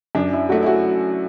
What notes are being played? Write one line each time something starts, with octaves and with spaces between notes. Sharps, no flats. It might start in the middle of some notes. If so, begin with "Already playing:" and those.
F#2 D4
E4
F#3 A3 F#4
E4
F#4